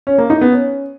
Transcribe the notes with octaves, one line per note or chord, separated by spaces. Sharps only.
C#4
A#3
D#4
B3
C#4